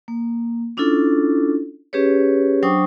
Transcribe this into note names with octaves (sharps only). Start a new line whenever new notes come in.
A#3
C#4 D4 E4 F4 A4
C#4 G4 G#4 B4 C#5
F#3 D4 C5 G5 C#6 D#6